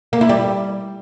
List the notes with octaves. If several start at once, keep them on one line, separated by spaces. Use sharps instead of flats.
A#3
E4
G3